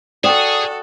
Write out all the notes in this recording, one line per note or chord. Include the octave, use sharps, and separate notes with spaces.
F#4 G#4 A4 D5 G5 D#6 E7